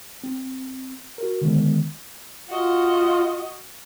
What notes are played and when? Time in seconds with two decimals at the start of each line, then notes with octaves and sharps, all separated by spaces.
0.24 C4
1.18 F#4 A#4
1.41 D3 D#3 G#3 B3
2.50 F4 F#4 D#5